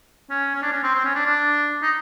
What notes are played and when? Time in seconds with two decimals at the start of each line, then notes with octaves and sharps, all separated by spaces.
0.30 C#4
0.55 C#4
0.63 D4
0.72 C#4
0.83 C4
0.94 C4
1.05 C#4
1.15 D4
1.26 D4
1.83 D#4